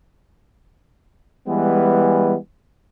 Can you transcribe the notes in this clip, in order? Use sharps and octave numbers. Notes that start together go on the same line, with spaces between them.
E3 G3 G#3 B3